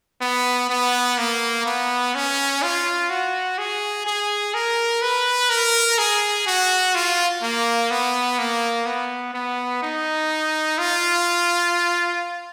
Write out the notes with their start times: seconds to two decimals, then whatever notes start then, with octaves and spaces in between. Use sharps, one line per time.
0.21 B3
0.70 B3
1.18 A#3
1.66 B3
2.15 C#4
2.63 F4
3.10 F#4
3.58 G#4
4.06 G#4
4.54 A#4
5.02 B4
5.50 A#4
5.99 G#4
6.47 F#4
6.95 F4
7.42 A#3
7.90 B3
8.39 A#3
8.86 B3
9.34 B3
9.83 D#4
10.78 F4